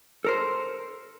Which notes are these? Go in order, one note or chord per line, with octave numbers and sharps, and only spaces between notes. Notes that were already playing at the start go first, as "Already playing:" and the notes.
A4 A#4 C5